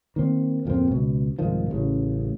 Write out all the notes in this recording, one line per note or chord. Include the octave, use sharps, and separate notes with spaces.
D#3 A#3 C4
D1 F2 A#3 C4
C#2 B2
C2 G#2 D#3 F3
A1 C#3